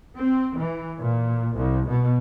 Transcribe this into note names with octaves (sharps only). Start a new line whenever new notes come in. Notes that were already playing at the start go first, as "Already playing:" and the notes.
C4
E3
A#2
C2
B2